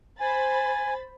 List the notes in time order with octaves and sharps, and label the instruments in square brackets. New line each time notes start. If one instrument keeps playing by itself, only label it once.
[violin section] C5 B5 A6 [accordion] G#5